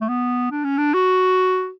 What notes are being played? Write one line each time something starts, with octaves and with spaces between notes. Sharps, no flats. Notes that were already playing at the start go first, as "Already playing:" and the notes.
A3
B3
D4
C#4
D4
F#4